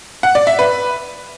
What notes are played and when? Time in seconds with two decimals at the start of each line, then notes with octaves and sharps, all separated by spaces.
0.23 F#5
0.35 D5
0.47 E5
0.59 B4